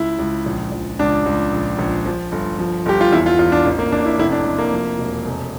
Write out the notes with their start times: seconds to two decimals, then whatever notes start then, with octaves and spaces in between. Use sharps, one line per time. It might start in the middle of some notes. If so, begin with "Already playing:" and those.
Already playing: C#2 E4
0.18 C#2
0.46 A#1
0.72 A#1
0.99 C#2 D4
1.25 C#2
1.52 A#1
1.79 A#1
2.06 F3
2.32 G1
2.58 F3
2.86 G1 G4
3.01 F4
3.12 E2 E4
3.26 F4
3.39 E2 F4
3.52 D4
3.65 A1
3.79 A#3
3.92 A1 D4
4.06 E4
4.18 F1 E4
4.32 D4
4.45 F1
4.58 A#3
4.72 F3
4.99 E1
5.25 F1